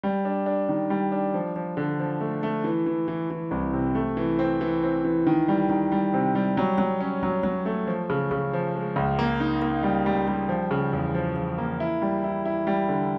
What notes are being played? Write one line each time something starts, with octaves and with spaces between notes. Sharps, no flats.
G3
D4
D4
D#3
G3
D4
F3
F3
D3
F3
A3
A3
E3
E3
E3
E3
C2
C3
A3
E3
C4
E3
C4
E3
D#3
G3
D#3
G3
C3
G3
F#3
F#3
C#4
F#3
F#3
A3
F3
C#3
C#3
F3
G#3
C#2
A#3
D#4
A#3
G3
G3
G3
F3
C#3
E2
F3
F3
A#3
E4
G3
E4
E4
G3
D3